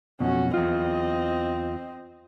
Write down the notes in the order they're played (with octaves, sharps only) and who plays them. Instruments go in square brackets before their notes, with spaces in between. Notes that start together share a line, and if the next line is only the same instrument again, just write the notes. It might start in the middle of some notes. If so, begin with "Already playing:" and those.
[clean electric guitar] B1 F2 B2 [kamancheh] C#4 F#4
[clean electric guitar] E2 F4 [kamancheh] C4 D#5